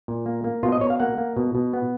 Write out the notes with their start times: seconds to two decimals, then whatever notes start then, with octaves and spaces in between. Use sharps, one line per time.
0.08 A#2
0.26 A#3
0.44 A#3
0.63 B2 F4
0.72 D#5
0.81 B2 C#5
0.90 F5
1.00 A#3 F#5
1.18 A#3
1.37 B2
1.55 B2
1.73 B3